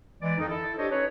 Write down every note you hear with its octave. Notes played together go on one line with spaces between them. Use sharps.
E3 G#3 D5
F2 D#3 D#4
E4 A4
D4 G4 A4 C5 C#5 D#5
C#4 D#4 B4 C#5